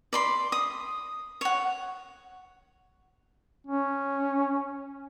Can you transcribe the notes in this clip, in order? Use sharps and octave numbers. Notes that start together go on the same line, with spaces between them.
D5 B5 C6
D#6
C#5 F#5
C#4